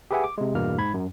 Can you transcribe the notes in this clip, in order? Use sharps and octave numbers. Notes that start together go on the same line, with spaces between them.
G4 G#4 B4 E5 F#5 G#5
D6
C3 G#3
E2 G2 B2 A#3 F6
G#2 B5 G#6
F#2